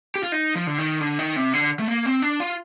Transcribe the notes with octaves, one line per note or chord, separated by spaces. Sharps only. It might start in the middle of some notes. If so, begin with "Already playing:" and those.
G4
F4
D#4
F3
D3
D#3
D3
D#3
C3
D3
A3
A#3
C4
D4
F4